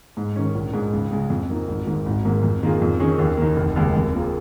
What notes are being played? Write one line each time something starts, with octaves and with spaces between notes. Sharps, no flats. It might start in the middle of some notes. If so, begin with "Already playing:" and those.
G#2
D#3 C#4
A#1
G#2 G#3
C#2
C#3 G#3
F2
F3 A#3 D#4
G#1
G#2 D#3
G#1
G#2 D#3 A#3
F2
D#3 A#3 F4 G#4
F2
D#3 C#4 G#4
D#2
D#3 A#3
F1
D#2 C#3 G#3
F2
F3 A#3 F4 G#4